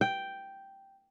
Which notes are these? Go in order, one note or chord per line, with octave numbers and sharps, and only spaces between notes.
G5